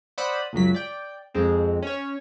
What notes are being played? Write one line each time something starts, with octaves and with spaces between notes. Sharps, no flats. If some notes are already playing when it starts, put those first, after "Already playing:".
C5 D5 F#5 B5 D#6 E6
C#2 F#2 F#3 B6
D5 G5
F2 G#3 C4
C#4 C#5